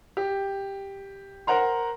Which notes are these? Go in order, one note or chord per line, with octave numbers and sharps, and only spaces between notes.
G4
A#4 C5 F#5 A#5 C6